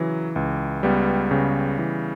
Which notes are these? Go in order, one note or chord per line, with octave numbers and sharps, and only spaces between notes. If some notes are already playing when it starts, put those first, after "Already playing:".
Already playing: C#3 E3 F#3
C#2
C#2 G3 B3
C#3
E3